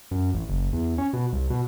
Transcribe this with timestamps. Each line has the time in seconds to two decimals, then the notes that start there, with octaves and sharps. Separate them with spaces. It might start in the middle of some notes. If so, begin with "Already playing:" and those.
0.11 F#2
0.34 A1
0.49 F#1
0.73 E2
0.98 C#4
1.13 B2
1.33 C2
1.50 B2